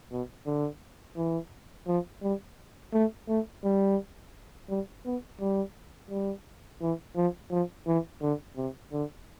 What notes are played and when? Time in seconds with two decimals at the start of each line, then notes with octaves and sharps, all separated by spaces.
0.12 B2
0.46 D3
1.17 E3
1.87 F3
2.23 G3
2.93 A3
3.29 A3
3.64 G3
4.70 G3
5.05 B3
5.40 G3
6.10 G3
6.82 E3
7.16 F3
7.51 F3
7.87 E3
8.22 D3
8.57 C3
8.93 D3